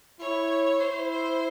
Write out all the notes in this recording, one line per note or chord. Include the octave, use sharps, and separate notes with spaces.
E4 C#5
E4 C5
C5